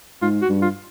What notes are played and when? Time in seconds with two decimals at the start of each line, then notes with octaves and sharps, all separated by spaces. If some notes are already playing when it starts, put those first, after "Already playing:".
0.22 G#2 F4
0.42 F#4
0.49 G2
0.62 F4